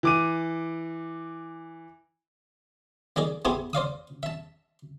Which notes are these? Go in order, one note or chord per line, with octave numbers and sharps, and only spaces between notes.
E3 D6 D#7
A#3 D#4 G#4 D5
B3 E4 G4 G#4 C5 G#5
C5 D5 F5 D#6
E5 A5